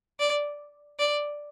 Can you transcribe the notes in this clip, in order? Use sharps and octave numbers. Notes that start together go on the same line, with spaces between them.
D5
D5